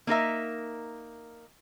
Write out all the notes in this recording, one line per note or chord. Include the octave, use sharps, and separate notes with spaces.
A#3 D#4 A#4 E5